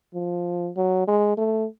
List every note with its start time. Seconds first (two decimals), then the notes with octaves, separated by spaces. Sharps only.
0.14 F3
0.76 F#3
1.08 G#3
1.37 A3